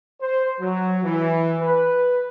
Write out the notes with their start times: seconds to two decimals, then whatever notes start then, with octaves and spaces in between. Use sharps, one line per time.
0.20 C5
0.60 F#3
1.03 E3
1.59 B4